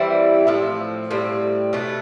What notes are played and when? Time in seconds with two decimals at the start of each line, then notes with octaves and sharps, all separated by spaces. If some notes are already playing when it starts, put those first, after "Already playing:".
Already playing: E3 G3 C4 E4
0.47 A2 F3 C4
1.11 A2 G3 C4
1.73 B2 A3 D4